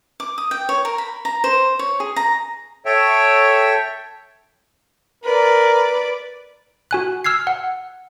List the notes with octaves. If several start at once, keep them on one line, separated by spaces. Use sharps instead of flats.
D6
D#6
G5
C#5
A#4
B5
A#5
C5
C#5
G#4
A#5
A4 C#5 E5 G5
A#4 B4 D5
F#4 G#5 F#6
E6 F6 G#6 C7
F#5